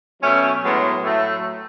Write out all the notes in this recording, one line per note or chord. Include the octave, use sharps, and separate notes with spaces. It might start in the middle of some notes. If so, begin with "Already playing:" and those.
B2 F#3 A3 C#4
A2 F#3 G#3 B3
A2 F#3 A3